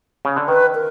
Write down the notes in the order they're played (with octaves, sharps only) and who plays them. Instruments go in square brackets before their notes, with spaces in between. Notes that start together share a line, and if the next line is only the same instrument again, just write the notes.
[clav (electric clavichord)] C#3
D3
[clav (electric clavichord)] D#3 [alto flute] B4
[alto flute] A#4